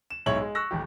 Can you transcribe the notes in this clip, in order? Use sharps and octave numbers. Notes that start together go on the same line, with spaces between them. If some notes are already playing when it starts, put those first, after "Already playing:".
E7
B1 G#2 E4 C#5 F#7
G#3
C#6 E6 F#6 A#6
D#1 A1 G4